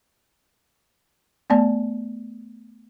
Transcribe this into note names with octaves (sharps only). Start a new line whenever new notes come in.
A3 B3 D5 A5